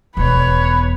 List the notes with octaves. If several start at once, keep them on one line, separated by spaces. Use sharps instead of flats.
E1 E2 B4 C#5